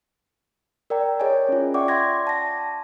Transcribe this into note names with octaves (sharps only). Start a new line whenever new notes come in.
A#4 D5 G5 A#5
G#4 C#5 D#5 G#5
C#4 F4
D5 E5 F#5 G5 C#6 D6
D5 E5 F#5 C6 G#6 A#6
A5 A#6